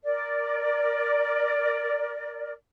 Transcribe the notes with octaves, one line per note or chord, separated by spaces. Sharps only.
A#4 D5